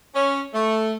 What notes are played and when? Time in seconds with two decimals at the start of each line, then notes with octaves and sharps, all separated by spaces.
0.14 C#4
0.54 A3